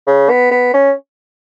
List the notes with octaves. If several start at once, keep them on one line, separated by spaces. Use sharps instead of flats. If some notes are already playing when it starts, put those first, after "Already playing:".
C#3
B3
B3
C#4